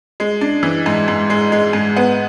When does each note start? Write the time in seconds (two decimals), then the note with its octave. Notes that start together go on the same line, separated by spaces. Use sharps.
0.20 G#3
0.41 D4
0.63 E3
0.86 G#2
1.08 G#2
1.30 G#3
1.52 G#3
1.73 G#2
1.96 B3